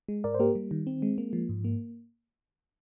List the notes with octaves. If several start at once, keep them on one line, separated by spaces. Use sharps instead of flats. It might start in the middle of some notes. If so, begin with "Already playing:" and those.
G#3
G#2 A#4 D5
C5
A#3 G4 A#4
G3
D#3
C4
G#3
A#3
F3
G#2
A#3